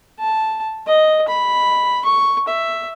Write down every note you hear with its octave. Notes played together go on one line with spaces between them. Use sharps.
A5
D#5
B5
C#6
E5